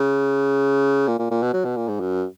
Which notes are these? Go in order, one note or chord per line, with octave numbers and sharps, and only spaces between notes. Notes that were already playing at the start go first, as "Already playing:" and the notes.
Already playing: C#3
A#2
A#2
A#2
B2
F#3
B2
A#2
G#2
F#2